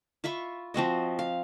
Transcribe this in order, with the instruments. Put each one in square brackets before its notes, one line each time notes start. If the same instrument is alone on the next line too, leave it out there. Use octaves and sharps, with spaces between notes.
[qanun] F4 E5 B5 C#6
F3 C4 F#4 D#5
F5